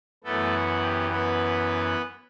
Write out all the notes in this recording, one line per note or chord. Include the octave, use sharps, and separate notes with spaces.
F#2 E3 A3 B3 A4
F#4
G4
B3 B4